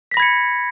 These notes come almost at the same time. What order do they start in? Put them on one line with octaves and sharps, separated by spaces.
B6 A#6 B5 G#6 C#7